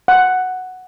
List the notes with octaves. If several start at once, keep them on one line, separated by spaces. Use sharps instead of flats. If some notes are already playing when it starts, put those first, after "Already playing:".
F#5